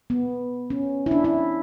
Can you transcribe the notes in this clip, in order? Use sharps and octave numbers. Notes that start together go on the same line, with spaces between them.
B3
C#4
E4
D4
E4